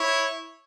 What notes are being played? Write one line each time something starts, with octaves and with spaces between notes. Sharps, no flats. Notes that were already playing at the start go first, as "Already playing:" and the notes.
Already playing: E4 C#5